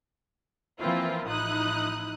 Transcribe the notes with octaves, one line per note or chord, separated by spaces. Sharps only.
E3 F3 A#3 C4 E4 F4
A1 F3 D#4 E4 D#6 F#6